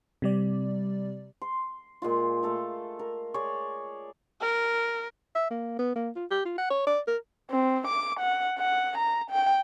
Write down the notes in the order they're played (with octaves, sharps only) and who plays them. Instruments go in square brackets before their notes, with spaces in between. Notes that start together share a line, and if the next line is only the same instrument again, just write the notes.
[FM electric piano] C3 G3 D5
[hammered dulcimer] C6
A#2 G#3 F4
A3 A4 F5
A#4
G#4 C#5 D5
[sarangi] A#4
[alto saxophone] E5
A#3
B3
A#3
F4
G4
F4
F#5
C#5
D5
A#4
[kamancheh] C4
D6
F#5
F#5
A#5
G5